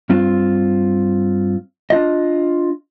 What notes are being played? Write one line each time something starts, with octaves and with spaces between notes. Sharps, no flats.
G2 C4 F4
D4 F4 D#5